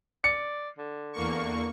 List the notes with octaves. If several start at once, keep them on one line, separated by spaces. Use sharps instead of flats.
D5 C#7
D3
E2 A#3 C#6